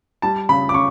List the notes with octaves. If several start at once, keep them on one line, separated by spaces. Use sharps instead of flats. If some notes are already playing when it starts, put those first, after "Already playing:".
G3 A5
C#3 B5
D6
C#3 C#6